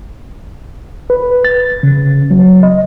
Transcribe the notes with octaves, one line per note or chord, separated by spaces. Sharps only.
B4
A6
C#3
F#3
D#5